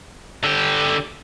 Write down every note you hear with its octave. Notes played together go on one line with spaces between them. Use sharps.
D3 G4